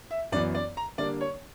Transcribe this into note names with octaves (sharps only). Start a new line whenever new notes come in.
E5
F#2 E3 B3 D5
D5
A#5
D3 G3 A#3 D4 D5
C#5